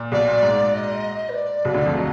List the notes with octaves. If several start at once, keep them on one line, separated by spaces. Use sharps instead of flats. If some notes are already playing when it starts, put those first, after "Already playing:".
Already playing: A#2
B1 B2 D5
A#2
G#2
D#5
B4
D5
B1 B2
D2 D3
F2 F3
F#3 D#5